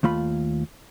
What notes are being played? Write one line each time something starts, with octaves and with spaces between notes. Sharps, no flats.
D#2 A3 F4 B5